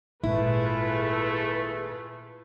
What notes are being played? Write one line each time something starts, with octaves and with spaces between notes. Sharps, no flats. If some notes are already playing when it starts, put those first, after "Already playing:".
G#1 A#2 A3 E4 F4 G#4 B4